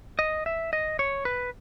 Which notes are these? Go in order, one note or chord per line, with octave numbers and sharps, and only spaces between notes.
D#5
E5
D#5
C#5
B4